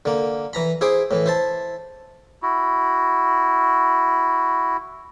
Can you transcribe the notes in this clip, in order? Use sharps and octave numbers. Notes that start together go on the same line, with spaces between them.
D3 A#3
E3 A#5 B5
E4 G#4 C5 D6
A2 E3
E4 C5 A5
E4 F#4